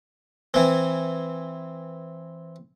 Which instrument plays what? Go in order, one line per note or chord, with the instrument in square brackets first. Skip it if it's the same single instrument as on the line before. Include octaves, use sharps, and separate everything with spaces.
[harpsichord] E3 C4